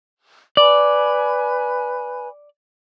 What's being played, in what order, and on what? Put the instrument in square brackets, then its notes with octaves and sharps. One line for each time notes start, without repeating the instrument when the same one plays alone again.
[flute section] B4 G#5 B5 [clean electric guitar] D5